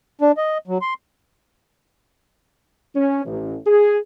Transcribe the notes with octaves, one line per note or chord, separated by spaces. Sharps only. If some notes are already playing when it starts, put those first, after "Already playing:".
D4
D#5
F#3
C6
C#4
A1
G#4